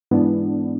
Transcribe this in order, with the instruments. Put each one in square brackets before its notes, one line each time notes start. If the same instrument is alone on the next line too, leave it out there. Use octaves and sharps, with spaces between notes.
[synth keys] G#2 E3 B3 D4